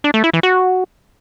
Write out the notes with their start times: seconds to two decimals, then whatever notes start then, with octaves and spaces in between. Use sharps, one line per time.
0.04 D4
0.14 A3
0.24 E4
0.33 E3
0.43 F#4